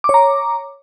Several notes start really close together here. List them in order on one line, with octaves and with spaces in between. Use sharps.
D6 C#5 A#5